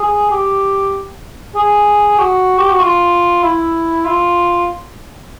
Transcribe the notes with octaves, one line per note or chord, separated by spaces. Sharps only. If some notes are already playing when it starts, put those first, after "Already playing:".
Already playing: G#4
G4
G#4
F#4
G4
F#4
F4
E4
F4